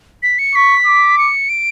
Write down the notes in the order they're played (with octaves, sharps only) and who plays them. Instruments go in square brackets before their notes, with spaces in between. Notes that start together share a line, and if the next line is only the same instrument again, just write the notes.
[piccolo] B6
C#7
[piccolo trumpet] C#6 [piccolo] B6
[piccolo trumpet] D6
[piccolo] C#7
D7